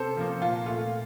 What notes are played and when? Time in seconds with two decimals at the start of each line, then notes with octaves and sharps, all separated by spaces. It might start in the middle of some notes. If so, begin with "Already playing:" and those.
Already playing: C3 A4 C5
0.17 F3 A#3
0.41 A#2 F4
0.66 A3 F4